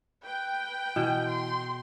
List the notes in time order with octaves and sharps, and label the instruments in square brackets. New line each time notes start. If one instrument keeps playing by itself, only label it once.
[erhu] B4 [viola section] G5
[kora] B2 [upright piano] E3
[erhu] C6